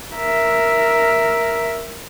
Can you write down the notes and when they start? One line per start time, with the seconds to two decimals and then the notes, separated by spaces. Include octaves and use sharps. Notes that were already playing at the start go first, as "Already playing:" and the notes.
0.15 A#4 E5